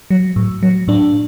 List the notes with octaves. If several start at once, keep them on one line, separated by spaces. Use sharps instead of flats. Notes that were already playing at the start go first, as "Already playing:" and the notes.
F#3
A2
F#3
A2 D4